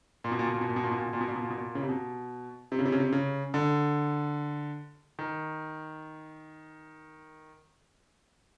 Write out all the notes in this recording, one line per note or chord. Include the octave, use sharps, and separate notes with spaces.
A#2
B2
A#2
B2
A#2
B2
A#2
B2
A#2
B2
A#2
B2
A#2
B2
A#2
B2
A#2
B2
A#2
C#3
C3
B2
C3
C#3
C3
C#3
C3
C#3
D3
D#3